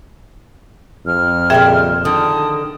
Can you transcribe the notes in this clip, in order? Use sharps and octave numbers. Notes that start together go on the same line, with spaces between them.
F2 F6
A#2 C#3 G3 G#4 E5 G5
D3 D#3 D#4 A5 D#6